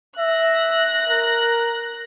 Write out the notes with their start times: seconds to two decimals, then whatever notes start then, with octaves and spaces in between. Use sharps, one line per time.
0.18 E5 F#6 A#6
1.09 A#4